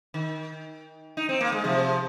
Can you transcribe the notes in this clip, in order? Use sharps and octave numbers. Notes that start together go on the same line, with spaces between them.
D#3
D#4
C4
A#3
G#3
C3 F3